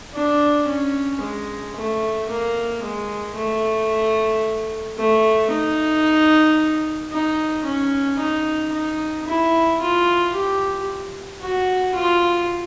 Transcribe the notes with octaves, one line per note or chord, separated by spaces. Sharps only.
D4
C#4
G#3
A3
A#3
G#3
A3
A3
D#4
D#4
C#4
D#4
D#4
E4
F4
G4
F#4
F4